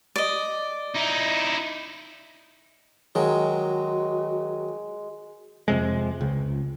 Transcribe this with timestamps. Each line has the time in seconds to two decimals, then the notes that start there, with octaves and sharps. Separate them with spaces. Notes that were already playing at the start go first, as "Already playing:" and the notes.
0.16 D5 D#5
0.95 D#4 E4
3.15 D#3 F#3 G#3 F#4
5.68 F2 C3 G#3
6.21 C#2